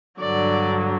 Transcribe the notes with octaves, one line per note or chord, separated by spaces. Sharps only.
G2 D3 F#3 D5